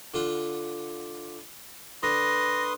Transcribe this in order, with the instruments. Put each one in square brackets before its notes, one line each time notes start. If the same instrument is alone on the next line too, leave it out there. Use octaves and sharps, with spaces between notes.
[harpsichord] D3 F4 F#5
[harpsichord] D3 [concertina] B4 C6 D#6 [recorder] A#6